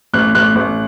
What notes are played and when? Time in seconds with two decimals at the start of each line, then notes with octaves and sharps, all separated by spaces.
0.13 A1 F#6
0.34 A1 F#6
0.55 A1